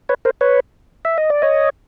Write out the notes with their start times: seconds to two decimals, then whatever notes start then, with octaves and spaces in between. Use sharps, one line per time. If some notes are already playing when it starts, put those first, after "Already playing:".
0.09 B4 C#5
0.25 A#4 C5
0.41 B4 C#5
1.05 E5
1.18 D#5
1.30 D5
1.42 C#5 D#5